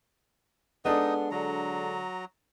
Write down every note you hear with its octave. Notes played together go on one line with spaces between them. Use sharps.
G#3 B3 D4 D#4 A4 D#5
D3 F#3 A#5